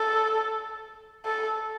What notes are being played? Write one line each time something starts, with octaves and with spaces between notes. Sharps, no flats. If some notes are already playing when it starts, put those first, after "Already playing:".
Already playing: A4
A4